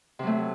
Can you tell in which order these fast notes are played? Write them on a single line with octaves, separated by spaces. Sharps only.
C3 F#3 A3